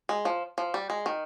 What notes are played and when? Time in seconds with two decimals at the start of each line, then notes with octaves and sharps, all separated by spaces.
0.09 G#3
0.25 F3
0.58 F3
0.74 G3
0.90 G#3
1.06 D#3